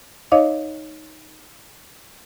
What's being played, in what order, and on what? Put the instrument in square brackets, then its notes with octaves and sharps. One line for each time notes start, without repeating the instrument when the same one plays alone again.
[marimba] D#4 C#5 D#5 F5 D6